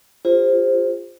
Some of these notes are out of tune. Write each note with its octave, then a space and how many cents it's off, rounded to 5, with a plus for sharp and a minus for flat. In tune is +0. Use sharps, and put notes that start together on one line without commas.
F4 +0 G#4 -45 C5 +0